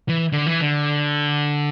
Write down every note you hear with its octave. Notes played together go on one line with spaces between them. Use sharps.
E3
D3
E3
D3